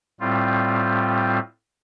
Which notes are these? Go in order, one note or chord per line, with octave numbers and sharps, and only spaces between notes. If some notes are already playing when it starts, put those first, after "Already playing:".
A2 G3 C4 F4